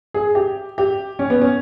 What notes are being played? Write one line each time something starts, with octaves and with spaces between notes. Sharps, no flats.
G#4
G4
G4
C#4
B3
C#4